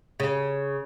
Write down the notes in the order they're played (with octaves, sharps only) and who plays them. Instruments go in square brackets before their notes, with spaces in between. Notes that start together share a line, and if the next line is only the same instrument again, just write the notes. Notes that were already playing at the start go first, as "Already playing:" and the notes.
[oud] C#3